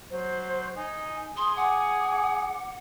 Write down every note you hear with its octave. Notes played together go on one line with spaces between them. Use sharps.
F#3 C5
D#4 G#5
G#4 C6 D#6
F#5 G#5 D6